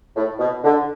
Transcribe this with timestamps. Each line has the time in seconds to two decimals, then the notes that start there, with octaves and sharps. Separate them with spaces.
0.15 A2
0.39 B2
0.63 D3